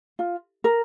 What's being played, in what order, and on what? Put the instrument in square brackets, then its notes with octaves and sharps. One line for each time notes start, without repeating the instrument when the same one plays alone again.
[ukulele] F4
A#4